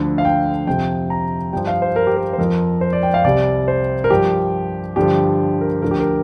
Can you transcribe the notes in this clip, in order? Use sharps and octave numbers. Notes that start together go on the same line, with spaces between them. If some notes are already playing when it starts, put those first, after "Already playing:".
Already playing: D2 D3 F3
F5
G5
F2 C3 F3 G5
A#5
G2 F3 G5
F5
C5
A#4
G4
A#4
C5
F2 F3 A#4
C5
D5
G5
F5
C2 C3 G3 D5
C5
A#4
G2 F3 G4
G2 D3 F3 G4
A#4
D2 D3 F3 A#4
G4
A#4